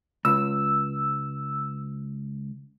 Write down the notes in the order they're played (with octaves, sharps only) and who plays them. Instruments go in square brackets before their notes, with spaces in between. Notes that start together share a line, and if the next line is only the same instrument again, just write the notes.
[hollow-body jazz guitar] C#2 [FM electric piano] E6